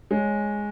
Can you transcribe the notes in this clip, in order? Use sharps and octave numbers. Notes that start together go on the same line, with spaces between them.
G#3 C#5